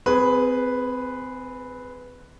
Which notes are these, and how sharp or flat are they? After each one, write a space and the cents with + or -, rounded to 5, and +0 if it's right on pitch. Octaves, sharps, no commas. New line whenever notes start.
C4 -30 G#4 +0 B4 +0